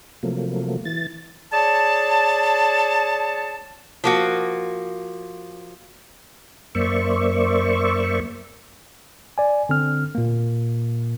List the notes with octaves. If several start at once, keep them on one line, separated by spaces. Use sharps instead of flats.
C3 F3 F#3 A3 A#3
E3 A6
G#4 C#5 D5 A5
F3 A#3 F#4
F#2 A#3 C5 D5 E5 C#6
D5 G#5
D3 C4 F6
A#2 A#3